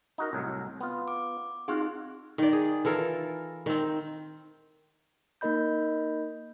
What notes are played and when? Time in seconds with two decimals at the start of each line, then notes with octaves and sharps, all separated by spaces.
0.18 D#4 F#4 A#4
0.33 C2 A2 F#3
0.81 B3 F4
1.08 D6
1.68 C4 D#4 F4 F#4 G#4 F5
2.38 D#3 D5
2.53 G#4
2.85 E3 F4 A4 A#4
3.66 D#3 C4
5.41 A#3 D#4 A#4 D#5 B5 G6